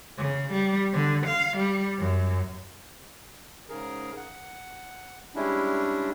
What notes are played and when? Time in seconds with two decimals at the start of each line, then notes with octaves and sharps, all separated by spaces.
0.18 C#3
0.52 G3
0.93 D3
1.27 F5
1.58 G3
1.98 F#2
3.69 G#2 C#3 G#4 A#4
4.17 F#5
5.35 G3 G#3 C#4 D4 E4